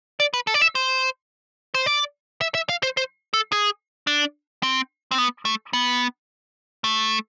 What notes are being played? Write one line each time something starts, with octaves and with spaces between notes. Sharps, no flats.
D5
B4
A4
D5
E5
C5
C5
D5
E5
E5
F5
C5
C5
A4
G#4
D4
C4
C4
B3
A3
B3
A3